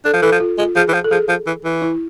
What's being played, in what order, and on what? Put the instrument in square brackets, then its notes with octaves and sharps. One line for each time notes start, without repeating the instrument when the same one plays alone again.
[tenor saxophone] D4 [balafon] A4
[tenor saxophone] F3
[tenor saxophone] E3 [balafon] A4
[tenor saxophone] F3
[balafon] F4
[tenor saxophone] G#3 [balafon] F4
[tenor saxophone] F3 [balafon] G#4
[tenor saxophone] E3
F3
[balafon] A4
[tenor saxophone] F3 [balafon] G#4
[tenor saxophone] F3
E3
E3
[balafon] E4